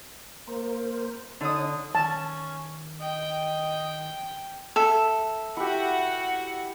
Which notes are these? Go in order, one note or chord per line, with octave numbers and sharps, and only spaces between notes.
A#3 A#4 C5
D3 D4 D#4 C#5 D#6
D#3 C#4 A5
D#5 G5
A4 E5
E4 F#4 G4 F#5